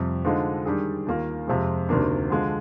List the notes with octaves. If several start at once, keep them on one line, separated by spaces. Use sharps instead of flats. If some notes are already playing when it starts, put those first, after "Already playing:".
Already playing: F2 C3 G3
D3 F3 G#3 D#4
D#3 G3 D4 G#4
D#2 D#3 A#3 F4 A#4
F2 C3 F3 G#3
D2 C3 D#3 A#3 D4
D3 F3 G#3